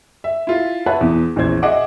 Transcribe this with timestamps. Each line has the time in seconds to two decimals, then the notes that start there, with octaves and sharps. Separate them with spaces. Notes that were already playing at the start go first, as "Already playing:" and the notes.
0.24 E5
0.47 E4 F4
0.86 B4 C#5 E5 F#5 A5
1.01 E2 B3
1.36 A#1 E2 C#4 C5 G#6
1.63 G#4 D#5 E5 F#5 D6